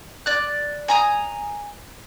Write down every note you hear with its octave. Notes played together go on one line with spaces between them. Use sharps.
D5 F#6
G#5 A#5 D#6